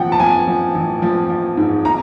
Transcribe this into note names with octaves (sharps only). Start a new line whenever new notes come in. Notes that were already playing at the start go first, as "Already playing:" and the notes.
Already playing: A1 F3 F#5 G5
A5
F3 G#5
F3
A1
F3
F3
G#2
A#5